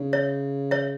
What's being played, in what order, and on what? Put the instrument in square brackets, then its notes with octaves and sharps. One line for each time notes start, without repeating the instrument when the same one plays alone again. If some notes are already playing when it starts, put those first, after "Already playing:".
Already playing: [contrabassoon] C#3
[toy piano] C#5 E5
C#5 E5